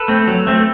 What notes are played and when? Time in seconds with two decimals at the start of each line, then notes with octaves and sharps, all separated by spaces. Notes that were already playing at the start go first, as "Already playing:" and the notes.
Already playing: A4 B4
0.08 A3 C4
0.27 F#3
0.47 A3 C4